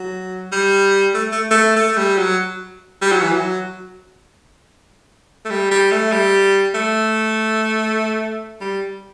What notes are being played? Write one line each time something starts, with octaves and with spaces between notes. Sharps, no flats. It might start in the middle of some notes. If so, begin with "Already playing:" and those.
Already playing: F#3
G3
A3
A3
A3
A3
G3
F#3
G3
F#3
E3
F#3
A3
G3
G3
A3
G3
A3
G3